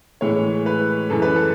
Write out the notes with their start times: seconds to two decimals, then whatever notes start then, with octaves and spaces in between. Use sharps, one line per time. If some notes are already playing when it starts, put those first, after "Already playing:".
0.21 A2 E3 G#3 C#5
0.66 B4
1.10 F#2 E3 G#3 A4
1.22 B4
1.36 A4